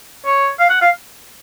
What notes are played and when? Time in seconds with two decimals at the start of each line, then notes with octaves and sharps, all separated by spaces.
0.25 C#5
0.59 F5
0.69 F#5
0.81 F5